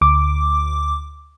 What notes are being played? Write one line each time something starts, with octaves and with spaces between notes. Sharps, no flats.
D2 D6